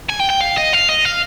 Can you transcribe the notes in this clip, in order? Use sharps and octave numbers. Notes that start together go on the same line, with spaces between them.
G#5
G5
G5
F5
D#5
F5
D#5
F5